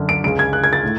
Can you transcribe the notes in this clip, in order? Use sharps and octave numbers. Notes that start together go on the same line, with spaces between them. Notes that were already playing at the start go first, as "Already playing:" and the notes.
Already playing: F#2 D3
D7
C#2 C#3 G#3 D7
G#6
F#6
G#6
A6
A2